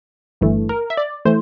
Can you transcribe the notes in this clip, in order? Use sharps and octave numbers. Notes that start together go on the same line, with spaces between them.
G1 G2 E3 A3
A#4
E5
D5
E3 A3 C5